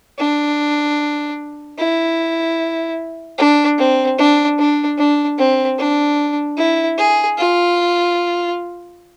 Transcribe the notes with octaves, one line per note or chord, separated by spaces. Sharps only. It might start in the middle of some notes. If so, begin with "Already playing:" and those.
D4
E4
D4
C4
D4
D4
D4
C4
D4
E4
G#4
F4